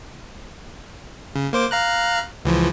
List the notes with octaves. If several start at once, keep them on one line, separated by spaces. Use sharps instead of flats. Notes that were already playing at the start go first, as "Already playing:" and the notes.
C#3
A#3 C5 D6
F5 A#5 F#6
C#2 E3 F3